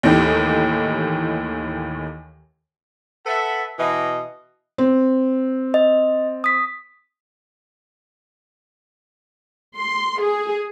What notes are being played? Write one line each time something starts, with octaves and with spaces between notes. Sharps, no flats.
D#2 A2 D#3 E3 G4
A4 B4 E5 F#5 A5
B2 E3 D#5
C4
D#5
D#6 B6
C6
G#4